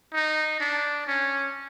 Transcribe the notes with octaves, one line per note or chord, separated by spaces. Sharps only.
D#4
D4
C#4